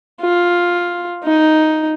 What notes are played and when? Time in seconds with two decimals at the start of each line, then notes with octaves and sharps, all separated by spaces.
0.21 F4
1.24 D#4